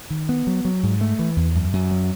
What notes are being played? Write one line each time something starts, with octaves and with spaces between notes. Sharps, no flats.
D#3
B3
F#3
F#3
G#2
A3
E3
E2
F#2
F#2
F#3